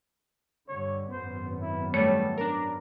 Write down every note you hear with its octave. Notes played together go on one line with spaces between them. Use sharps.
G2 D3 C#5
G#1 F#2 B3 C5
E4
G3 A3 G#4 A4 C#5
D4 A#4 A#5